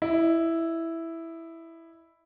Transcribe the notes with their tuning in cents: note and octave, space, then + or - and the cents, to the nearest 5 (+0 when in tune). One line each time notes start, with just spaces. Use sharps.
E4 +0 D#5 -25